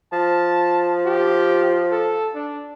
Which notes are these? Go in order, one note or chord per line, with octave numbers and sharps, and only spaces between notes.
F3 A5
G4
A4
D4